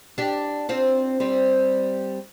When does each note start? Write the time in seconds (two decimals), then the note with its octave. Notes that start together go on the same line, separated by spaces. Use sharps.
0.18 D4 G4
0.69 C4 F4
1.20 G3 C4